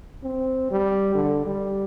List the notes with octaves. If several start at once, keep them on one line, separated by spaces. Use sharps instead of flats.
C4
G3
D3
G3